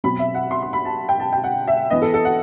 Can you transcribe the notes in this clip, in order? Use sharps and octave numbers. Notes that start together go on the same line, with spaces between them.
B2 F#3 C4 B5
E5
F#5
C6
C6
B5
A5
G5
A5
G5
F#5
E5
E3 B3 D#5
A4
A4
F#5